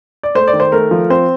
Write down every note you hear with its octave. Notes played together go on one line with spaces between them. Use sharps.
D5
A3 C5
D5
D#3
C5
A3 A#4
F3
C4 C5